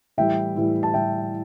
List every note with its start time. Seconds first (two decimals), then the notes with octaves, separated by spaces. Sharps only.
0.18 A2 E3 G3 E5 G5
0.56 A2 E3 G3
0.83 A5
0.94 A2 E3 G3 E5 G5